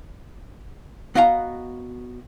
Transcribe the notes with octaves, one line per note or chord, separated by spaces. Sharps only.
B3 F#4 D#5 F5 G5 A#5